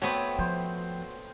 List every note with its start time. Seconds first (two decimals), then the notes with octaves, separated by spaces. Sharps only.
0.02 A3 B3 C4 F#4 C#5 G5
0.39 F3 C5